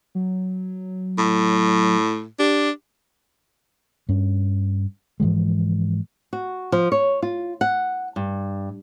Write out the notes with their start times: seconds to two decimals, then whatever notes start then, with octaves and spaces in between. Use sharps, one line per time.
0.15 F#3
1.18 A2
2.39 D4 G4
4.09 G2 C#4
5.20 G#2 E3 F3 G#3
6.33 F#4
6.72 F3
6.92 C#5
7.23 F4
7.61 F#5
8.16 G2